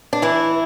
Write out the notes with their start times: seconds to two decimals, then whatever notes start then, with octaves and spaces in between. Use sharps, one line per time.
0.13 D4
0.22 E3 E4